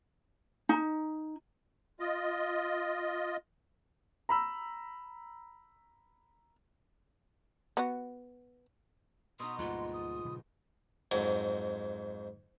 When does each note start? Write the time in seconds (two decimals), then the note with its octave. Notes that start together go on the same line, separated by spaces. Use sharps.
0.69 D#4
2.00 F4 D#5
4.29 A#5 B5 E6
7.77 B3 F#4
9.39 B2 B3 D#4 C6 D#6
9.59 D2 G#2 G3 A#3 F4 F#5
9.93 D#6
10.25 B2 D3 F#3
11.12 F2 G#2 F#3